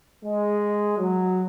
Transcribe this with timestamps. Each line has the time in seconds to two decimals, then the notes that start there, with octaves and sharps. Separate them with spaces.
0.23 G#3
0.98 F#3